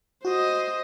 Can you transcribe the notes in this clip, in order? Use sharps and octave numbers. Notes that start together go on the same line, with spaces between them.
F#4 C5 D#5